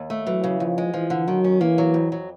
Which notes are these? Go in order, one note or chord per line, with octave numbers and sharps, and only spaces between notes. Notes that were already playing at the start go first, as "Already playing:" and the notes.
Already playing: D#2
A3
E3 F#3
C#3
D#2 F3
G#3
E3 F3
D3
D#3 F#3
C#4
E3 A#3
F#3
F2
F#3